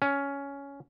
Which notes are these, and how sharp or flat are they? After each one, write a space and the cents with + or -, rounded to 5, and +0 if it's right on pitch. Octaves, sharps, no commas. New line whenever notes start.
C#4 +10